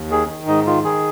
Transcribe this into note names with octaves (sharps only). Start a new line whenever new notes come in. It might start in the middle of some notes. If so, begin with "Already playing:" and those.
Already playing: D#2
D#3 G#4
D#3
G#2 D#4
D#3 F4
D#3 G#4